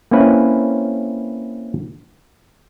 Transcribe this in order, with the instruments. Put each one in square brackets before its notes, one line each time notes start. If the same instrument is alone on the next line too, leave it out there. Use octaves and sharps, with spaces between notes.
[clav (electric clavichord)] A#3 C4 C#4 E4 B4